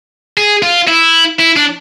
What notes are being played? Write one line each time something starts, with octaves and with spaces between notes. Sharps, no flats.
G#4
F4
E4
E4
D4